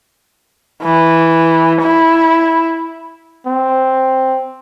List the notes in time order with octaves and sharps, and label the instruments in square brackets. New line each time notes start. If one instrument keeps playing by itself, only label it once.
[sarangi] E3
E4
[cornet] C4